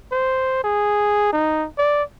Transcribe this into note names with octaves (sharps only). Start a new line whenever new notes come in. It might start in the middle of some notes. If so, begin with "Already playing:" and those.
C5
G#4
D#4
D5